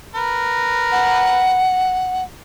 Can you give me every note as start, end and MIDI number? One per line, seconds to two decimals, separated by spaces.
0.15 1.63 70
0.15 1.63 71
0.92 2.23 78